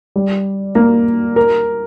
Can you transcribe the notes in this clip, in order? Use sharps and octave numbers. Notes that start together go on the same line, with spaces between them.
G3
A#3
A#4